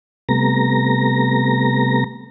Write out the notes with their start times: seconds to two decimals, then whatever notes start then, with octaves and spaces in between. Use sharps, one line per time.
0.29 C3 G3 A3 B3 A#5 A#6